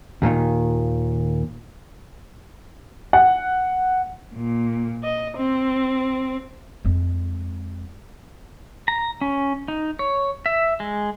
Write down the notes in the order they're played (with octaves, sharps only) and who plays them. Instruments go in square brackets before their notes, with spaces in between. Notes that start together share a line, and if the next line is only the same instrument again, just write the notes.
[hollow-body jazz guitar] D#2 A#2 D3 D#3
[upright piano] F#5
[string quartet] A#2
D#5
C4
[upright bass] F2 G#3
[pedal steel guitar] A#5
C#4
D#4
C#5
E5
G#3